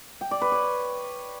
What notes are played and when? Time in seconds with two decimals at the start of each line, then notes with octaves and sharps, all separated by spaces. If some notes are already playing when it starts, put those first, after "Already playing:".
0.21 G5
0.31 D5
0.41 B4
0.52 C#5